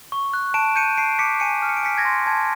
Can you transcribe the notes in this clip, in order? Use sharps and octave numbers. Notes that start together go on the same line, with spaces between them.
C#6
F#6
A5 D7 E7
G6 C#7 D#7
A5 C7 D7
D6 B6 C#7
G#5 C#7 D#7
F6
C#7
D7
G#5 B6 C#7
G#6 A#6
C6
A5 G#6